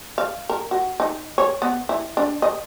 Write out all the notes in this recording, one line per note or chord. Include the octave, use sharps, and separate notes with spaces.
F5
A#4
F#4
D#4
C#5
B3
E4
D4
D#5